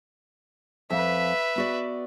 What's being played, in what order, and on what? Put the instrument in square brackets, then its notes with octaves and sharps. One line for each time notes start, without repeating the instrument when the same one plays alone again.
[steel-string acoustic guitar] F2 F5 [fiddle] B4 E5
[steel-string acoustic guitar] B3 F#4 D5